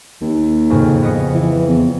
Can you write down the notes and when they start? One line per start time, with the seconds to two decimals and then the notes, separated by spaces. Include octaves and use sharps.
0.21 D#2
0.70 F2 A2 C#3
1.02 B3 D#5 C#7
1.34 E3
1.68 E2